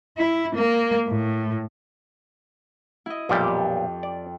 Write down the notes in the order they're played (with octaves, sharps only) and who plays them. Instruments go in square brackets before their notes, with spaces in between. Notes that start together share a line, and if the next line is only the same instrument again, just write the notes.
[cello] E4
A#3
A2
[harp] E4 D#5
[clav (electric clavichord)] B1 A#2 G3 [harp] F2 G4 G5
[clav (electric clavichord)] D5